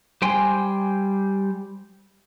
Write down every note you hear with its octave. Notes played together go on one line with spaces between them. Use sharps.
G3 C5 G5 G#5 C6